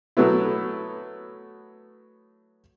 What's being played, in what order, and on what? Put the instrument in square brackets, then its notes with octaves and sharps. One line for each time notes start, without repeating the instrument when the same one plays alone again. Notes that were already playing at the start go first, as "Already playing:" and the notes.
[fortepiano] F#3 A3 B3 E4